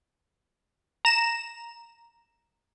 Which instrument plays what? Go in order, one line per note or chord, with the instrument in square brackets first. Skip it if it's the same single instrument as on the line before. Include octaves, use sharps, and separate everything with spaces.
[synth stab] A#5 E7